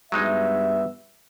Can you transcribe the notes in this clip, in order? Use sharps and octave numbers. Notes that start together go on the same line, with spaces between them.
G2 F#3 G#3 B3 D#4 E5